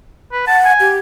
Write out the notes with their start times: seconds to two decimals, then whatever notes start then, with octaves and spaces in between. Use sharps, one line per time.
0.32 B4
0.47 F#5 A5
0.65 G#5
0.80 G4